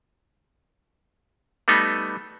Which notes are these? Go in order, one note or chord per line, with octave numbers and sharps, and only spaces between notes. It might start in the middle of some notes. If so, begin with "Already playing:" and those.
G3 A3 B3 D#4